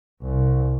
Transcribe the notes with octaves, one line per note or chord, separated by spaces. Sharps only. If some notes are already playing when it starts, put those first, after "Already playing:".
C2